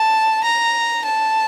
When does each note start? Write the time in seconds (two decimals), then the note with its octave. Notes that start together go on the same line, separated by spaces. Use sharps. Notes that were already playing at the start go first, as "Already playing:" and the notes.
Already playing: A5
0.43 A#5
1.04 A5